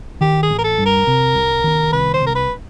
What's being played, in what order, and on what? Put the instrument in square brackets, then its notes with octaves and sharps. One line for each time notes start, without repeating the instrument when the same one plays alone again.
[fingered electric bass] D#3 [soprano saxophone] G4
[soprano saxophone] G#4
[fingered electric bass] A1
[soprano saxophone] A#4
A4
[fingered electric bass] G2
[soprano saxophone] A#4
[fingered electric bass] C3
C2
D#3
[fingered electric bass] C2 [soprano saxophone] B4
[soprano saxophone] C5
[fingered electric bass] C2
[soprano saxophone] A#4
B4